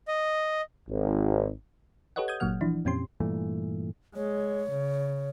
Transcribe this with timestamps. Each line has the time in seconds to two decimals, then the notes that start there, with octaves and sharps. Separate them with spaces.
0.08 D#5
0.89 G#1
2.16 G4 A4 B4 C#5 D#5 F#5
2.28 D#6 G6 G#6
2.40 G1 A#2 F#3 A#3 F#5 F6
2.61 E3 F3 D4 E4
2.85 F2 A#2 C4 C#4 G4 C6
3.20 G2 A#2 E3 A3
4.16 G#3 C#5
4.71 C#3